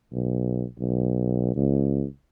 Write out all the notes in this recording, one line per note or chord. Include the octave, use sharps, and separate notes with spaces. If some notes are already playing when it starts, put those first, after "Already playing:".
B1
B1
C#2